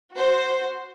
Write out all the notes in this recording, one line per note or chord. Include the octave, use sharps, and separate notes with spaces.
F#4 C5